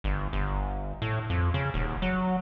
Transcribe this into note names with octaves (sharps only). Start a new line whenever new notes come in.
G1
G1
A2
F2
C#3
D#1
F#3